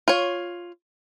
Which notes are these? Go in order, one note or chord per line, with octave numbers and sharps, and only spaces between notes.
F4 C#5